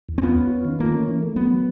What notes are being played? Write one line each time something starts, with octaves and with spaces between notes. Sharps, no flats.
E2
C4
B3 F4
C#4
F4
D#3
A3 A#3
C#4
E3
A3
F#3 B3
F#3